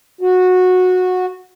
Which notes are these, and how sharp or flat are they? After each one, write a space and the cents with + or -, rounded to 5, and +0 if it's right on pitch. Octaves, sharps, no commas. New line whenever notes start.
F#4 -15